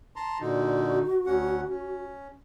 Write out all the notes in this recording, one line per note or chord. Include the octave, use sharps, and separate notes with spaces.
A5 A#5 C6
A#2 D3 D#4 F#4
D2 C#4 F#5
C#4